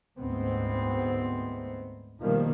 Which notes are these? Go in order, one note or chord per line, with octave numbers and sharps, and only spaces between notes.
D2 G#2 B3 C4
B2 D#3 F3 G3 A#3